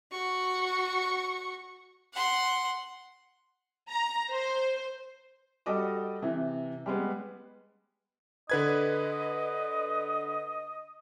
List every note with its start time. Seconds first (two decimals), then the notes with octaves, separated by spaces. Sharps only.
0.12 F#4 C#6
2.13 F#5 C6
3.90 A#5
4.30 C5
5.66 G3 F#4 A4 D#5 D6 D#6
6.22 C3 E3
6.86 G3 G#3 B3
8.50 D3 B4 D#5 G#6